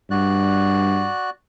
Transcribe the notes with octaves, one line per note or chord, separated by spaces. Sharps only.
G2 F#4 D5 F#6